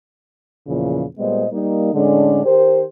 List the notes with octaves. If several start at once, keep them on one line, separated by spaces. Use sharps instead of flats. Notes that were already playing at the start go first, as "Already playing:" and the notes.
E2 A#2 C#3 E3 F3
A#2 G3 G#3 B3 C5 D#5
G3 A#3 D#4
A2 D3 G#3 C#4 D4 D5
D#3 G4 A#4 C5